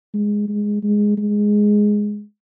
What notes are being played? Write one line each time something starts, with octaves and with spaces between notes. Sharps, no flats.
G#3
G#3
G#3
G#3